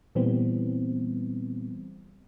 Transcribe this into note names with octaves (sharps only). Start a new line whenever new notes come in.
A#2 E3 G3 B3 C4